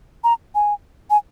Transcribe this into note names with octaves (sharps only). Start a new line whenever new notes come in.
A#5
G#5
G#5